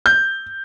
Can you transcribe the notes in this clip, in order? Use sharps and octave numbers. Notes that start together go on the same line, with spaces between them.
G6